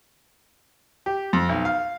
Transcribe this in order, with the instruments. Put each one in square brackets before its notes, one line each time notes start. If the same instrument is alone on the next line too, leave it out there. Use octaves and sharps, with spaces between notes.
[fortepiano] G4
F2
B1
F5